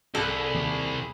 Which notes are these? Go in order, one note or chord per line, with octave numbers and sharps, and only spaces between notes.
C2 G#4 A4 B5
D#2